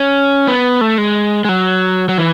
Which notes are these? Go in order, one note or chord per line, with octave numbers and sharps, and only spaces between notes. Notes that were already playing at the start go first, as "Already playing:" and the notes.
Already playing: C#4
B3
A3
G#3
G#3
F#3
F#3
E3